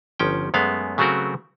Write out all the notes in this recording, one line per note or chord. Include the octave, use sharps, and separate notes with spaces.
G1 F3 C#4 G5
F#2 G#3 A3 B3 F5
C#3 F#3 A3 C4 F#4 A#4